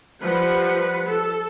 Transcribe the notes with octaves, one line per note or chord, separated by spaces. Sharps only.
F3 G3 B4 F#5
A4